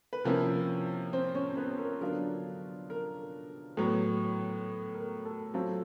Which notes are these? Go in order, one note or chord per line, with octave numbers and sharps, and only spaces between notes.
B4
C3 F3 A#3 C#4 E4 A#4
C4 C5
C#4 C#5
B3 B4
A#4
D3 F#3 B3 D4 F4 A#4
A#4
A2 F#3 B3
A#4
A4
F#3 A3 C4 F4 A4